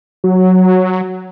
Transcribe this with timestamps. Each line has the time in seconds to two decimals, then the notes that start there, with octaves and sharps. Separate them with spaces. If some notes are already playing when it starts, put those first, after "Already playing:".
0.24 F#3